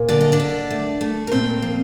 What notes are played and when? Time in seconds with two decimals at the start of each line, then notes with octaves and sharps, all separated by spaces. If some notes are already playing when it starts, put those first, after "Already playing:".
Already playing: A#2
0.09 D3 D5
0.21 D#5
0.32 D4 D5
0.40 D3
0.71 A3
1.01 A3
1.27 A#4
1.32 A#2 C4 C5
1.62 F3